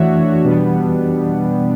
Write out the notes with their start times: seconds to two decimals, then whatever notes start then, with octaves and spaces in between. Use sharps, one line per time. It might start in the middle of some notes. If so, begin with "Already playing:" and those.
Already playing: E3 A3 D4 F#4 C#5 E5
0.44 B2 G3 B3 D4